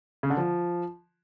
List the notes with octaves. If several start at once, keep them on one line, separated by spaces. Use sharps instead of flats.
C#3
D3
F3